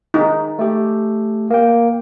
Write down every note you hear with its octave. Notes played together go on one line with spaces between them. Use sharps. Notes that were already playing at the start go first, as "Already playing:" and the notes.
D#4 G#4
A3 G4
A#3 G5